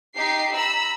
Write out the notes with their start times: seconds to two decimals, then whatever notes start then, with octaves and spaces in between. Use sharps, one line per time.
0.16 D#4 G4 C7
0.53 A#5 B5 E6